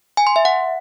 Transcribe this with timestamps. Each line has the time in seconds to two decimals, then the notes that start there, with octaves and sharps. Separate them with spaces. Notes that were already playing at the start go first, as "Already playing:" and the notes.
0.17 G#5
0.27 C6
0.36 E5
0.45 F#5